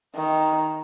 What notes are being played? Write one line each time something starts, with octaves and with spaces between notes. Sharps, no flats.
D#3